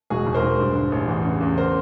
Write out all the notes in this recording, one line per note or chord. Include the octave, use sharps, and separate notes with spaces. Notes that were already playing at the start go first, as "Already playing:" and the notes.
E1 F#4 G#4
E1
A#4 C5
E1
G2
D3
A1
E2
C#3
E2
A#4 C5